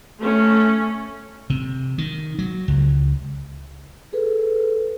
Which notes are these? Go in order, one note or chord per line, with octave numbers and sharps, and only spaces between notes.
A3 C#4
C3
D#3
F#3
C#2
G#4 A4 B4